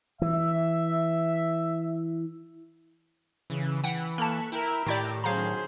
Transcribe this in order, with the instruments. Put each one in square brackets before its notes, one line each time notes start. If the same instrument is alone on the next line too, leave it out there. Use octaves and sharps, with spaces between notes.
[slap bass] E3 [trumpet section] E5
[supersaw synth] C#3 [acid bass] E3
[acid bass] E3 [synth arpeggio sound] F#5 G5 [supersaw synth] B5
[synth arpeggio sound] A#3 A5 [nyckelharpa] A4 [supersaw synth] C#6 F#6 B6
[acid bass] E4 [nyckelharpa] A#4 [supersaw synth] E5 G5
[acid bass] A2 [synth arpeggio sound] D#3 E4 D5 [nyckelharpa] G4 [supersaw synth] G5 A5 A#5
[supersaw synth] D#3 F#3 C#4 [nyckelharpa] G#4 C5 [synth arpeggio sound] F5 A#5